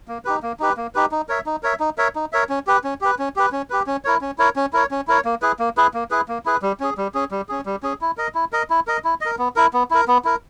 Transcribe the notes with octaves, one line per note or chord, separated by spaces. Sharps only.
A#3
D#4 G4 B4
A#3
D#4 G4 B4
A#3
D#4 G4 B4
D#4
A#4 C#5 E5
D#4
A#4 C#5 E5
D#4
A#4 C#5 E5
D#4
A#4 C#5 E5
C#4
G4 B4
C#4
G4 B4
C#4
G4 B4
C#4
G4 B4
C#4
E4 A#4 C#5
C#4
E4 A#4 C#5
C#4
E4 A#4 C#5
C#4
E4 A#4 C#5
A#3
E4 G#4 B4
A#3
E4 G#4 B4
A#3
E4 G#4 B4
A#3
E4 G#4 B4
G3
C#4 G#4
G3
C#4 G#4
G3
C#4 G#4
G3
C#4 G#4
E4
A#4 D#5
E4
A#4 D#5
E4
A#4 D#5
E4
A#4 D#5
B3
E4 A#4
B3
E4 A#4
B3
E4 A#4